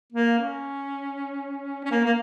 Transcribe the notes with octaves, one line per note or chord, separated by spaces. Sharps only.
A#3
C#4
C#4
A#3
A#3